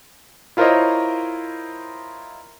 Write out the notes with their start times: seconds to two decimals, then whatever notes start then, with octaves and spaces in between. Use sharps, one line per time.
0.57 E4 F4 A#4 C5 C#5 D#5